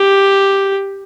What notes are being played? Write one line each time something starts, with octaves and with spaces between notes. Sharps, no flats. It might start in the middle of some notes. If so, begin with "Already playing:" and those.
Already playing: G4